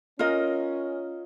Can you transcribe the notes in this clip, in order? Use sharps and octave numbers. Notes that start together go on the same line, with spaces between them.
C#4 F4 A#4 D#5